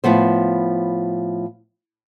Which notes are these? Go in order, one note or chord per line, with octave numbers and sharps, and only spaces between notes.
A2 F3 B3 C5